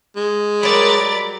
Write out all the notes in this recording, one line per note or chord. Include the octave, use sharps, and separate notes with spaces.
G#3
F#3 G3 A#4 D5 B5 A6